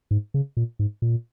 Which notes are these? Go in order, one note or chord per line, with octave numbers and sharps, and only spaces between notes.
G#2
C#3
A#2
G#2
A#2